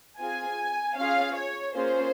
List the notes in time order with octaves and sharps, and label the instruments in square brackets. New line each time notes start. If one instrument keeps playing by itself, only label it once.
[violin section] C4 F4 G#4 G#5
C#4 F4 G#4 F5
C#5
A#3 C#4 F4 G#4 C5